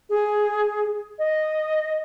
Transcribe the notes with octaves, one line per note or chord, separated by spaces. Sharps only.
G#4
D#5